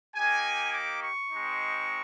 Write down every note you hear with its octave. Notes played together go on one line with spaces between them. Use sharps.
A#3 D#4 G4 G#5
D6
C#6
G#3 C4 D#4